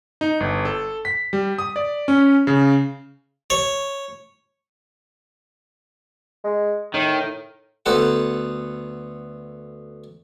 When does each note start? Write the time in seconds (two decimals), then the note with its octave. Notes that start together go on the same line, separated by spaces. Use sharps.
0.21 D#4
0.40 G1
0.65 A4
1.05 B6
1.33 G3
1.59 D#6
1.76 D5
2.08 C#4
2.47 C#3
3.50 C#5
6.44 G#3
6.94 A2 D#3
7.86 D2 B3 A4 C5 F#5